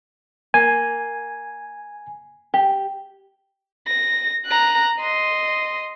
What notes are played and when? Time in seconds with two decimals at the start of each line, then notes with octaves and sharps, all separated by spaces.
0.54 A#3 G#5
2.54 G4
3.87 A#6
4.46 A#5 F#6
5.00 D#5 C6